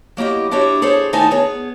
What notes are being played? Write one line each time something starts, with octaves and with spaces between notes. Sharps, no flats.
F#3 A#3 E4 G4 D#5
D4 E4 F#4 G4 C#5
G#4 A4 C5 C#5
D#3 A3 D#4 E4 G#5 A5
B3 G#4 C#5